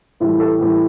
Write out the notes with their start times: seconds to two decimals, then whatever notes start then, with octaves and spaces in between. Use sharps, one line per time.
0.20 A2 E3 G3 F4
0.40 A4
0.59 A2 E3 G3